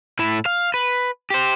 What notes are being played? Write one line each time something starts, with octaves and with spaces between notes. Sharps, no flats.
A2 E4
F5
B4
G4 C5